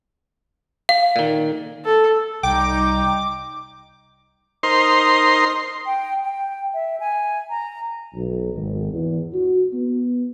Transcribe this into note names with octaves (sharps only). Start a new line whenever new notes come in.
F5
A#2 D#3
A4
C2 G3 D#4 G5 D6
D#4 A#4 C5 C6
G5
G5
E5
G#5
A#5
B1
G#1
E2
F#4
B3